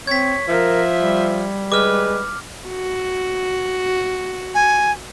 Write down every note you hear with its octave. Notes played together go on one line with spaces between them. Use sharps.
C4 C#5 G#6 B6
F3 A#4 E5
G3
G#3 B4 D6 F6
F#4
G#5